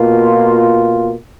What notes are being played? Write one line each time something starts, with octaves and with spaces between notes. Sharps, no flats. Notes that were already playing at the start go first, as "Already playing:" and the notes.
Already playing: B2 A#3 F4